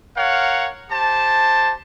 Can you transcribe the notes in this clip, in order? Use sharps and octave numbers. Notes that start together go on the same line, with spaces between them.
A#4 C#5 F5 F#5
G4 C5 A5